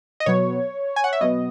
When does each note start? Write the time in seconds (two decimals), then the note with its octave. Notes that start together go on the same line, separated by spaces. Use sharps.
0.20 D#5
0.26 B2 F#3 B3 C#5
0.96 G#5
1.04 F#5
1.13 E5
1.21 B2 F#3 B3 D#5